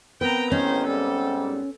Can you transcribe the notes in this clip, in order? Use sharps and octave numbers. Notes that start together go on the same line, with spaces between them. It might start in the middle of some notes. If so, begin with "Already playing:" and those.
B3 C4 A#4 B4 G5 A#5
A1 D#3 C#4 C5
G#2 G3 A4